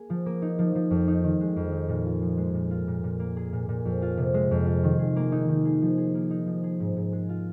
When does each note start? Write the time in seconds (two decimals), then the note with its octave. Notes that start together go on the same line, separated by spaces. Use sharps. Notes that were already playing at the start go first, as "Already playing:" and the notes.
Already playing: A#3 G#4
0.10 F3
0.26 A#3
0.42 D#4
0.59 F3
0.75 F3
0.91 F2
1.08 D#4
1.24 D#3
1.41 G#3
1.56 F2
1.72 D#4
1.89 A#2
2.06 F4
2.22 F3
2.37 G#3
2.54 A#2
2.71 F4
2.88 A#2
3.04 A#2
3.20 A#3
3.37 G#4
3.53 A#2
3.69 A#2
3.85 F2
4.02 F4
4.17 C3
4.34 G#3
4.51 F2
4.66 F4
4.84 D#3
4.99 G#4
5.16 A#3
5.32 D#4
5.48 D#3
5.65 G#4
5.82 F3
5.98 G#4
6.15 A#3
6.30 D#4
6.47 F3
6.64 G#4
6.80 G#2
6.96 G#2
7.13 G#3
7.29 F4